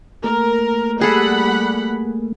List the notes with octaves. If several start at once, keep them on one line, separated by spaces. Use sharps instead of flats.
A3 A#3 A#4
G3 G#4 A4 F#5 B5